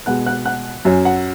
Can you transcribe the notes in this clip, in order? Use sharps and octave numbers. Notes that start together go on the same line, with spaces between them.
B2 G#3 B3 F#5 F#6
F#5 F#6
F#5 F#6
F#2 F#3 C#4 G#5
F#5